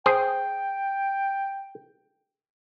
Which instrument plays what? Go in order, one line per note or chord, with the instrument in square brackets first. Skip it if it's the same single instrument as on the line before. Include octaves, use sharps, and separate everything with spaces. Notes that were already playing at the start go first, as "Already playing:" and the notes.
[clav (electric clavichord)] G#4 C5 [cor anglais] G5